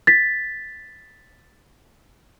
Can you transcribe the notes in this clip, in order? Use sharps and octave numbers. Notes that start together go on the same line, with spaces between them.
A6 B6